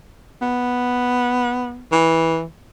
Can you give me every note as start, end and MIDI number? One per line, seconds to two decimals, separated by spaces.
0.41 1.83 59
1.92 2.43 52